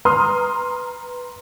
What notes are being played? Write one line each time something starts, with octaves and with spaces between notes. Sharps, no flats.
B4 A#5 C6 D#6 F6